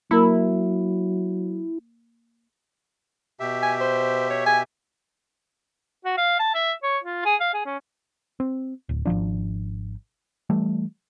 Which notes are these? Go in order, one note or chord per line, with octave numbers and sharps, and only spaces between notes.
F#3 A#3 E4 A#4
B2 G4 E5
G#5
C5
C#5
G#5
F#4
F5
A5
E5
C#5
F4
G#4
F5
G#4
C#4
C4
D1
G#1 F2 F3 D4
E3 G3 A3